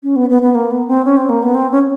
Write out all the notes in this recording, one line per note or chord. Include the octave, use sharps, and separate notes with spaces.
C#4
B3
B3
B3
A#3
B3
C4
C#4
C4
A#3
B3
C4
C#4